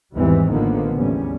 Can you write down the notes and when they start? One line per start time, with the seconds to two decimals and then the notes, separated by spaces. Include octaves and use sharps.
0.14 G#1 E2 E3 G3 C4
0.51 A1 D3 D#3 F3 A#3 B3
0.95 E2 A2 G3 C#4